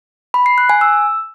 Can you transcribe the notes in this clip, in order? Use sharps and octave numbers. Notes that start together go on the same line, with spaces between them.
B5
C7
F#6
G#5
E6